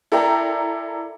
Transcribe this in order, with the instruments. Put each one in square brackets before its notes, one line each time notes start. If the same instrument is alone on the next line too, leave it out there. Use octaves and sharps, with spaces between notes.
[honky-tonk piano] E4 A4 A#4 D5 G5 A#5